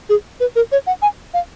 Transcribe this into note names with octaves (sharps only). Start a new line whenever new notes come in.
G#4
B4
A#4
C#5
F#5
G#5
F5